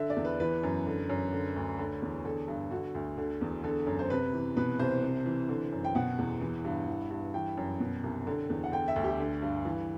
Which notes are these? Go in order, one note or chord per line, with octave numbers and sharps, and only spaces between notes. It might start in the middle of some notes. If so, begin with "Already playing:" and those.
Already playing: D3 E5
D5
E2
B4
E3 B4
F#2
D3
F#2
D3
D2
D3
E2
D3 A4
G2
D3 F#4
D2
D3
E2
D3 A4
F#2
C5
C3 B4
E3
B2 B4
C2 C5
C3
E3
D3
F#2
G5
B2 F#5
E2
E3
G2
E3
G2
E3 G5
F#2
B2
C2
D3
E2
F#5
D3 G5
E5
D2
G4
D3
G2
E3